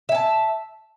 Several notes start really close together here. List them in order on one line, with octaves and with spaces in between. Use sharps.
E5 G#5 A5